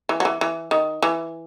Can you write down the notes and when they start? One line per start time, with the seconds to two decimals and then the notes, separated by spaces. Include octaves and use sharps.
0.09 E3
0.20 F#3
0.25 E3
0.41 E3
0.71 D#3
1.02 E3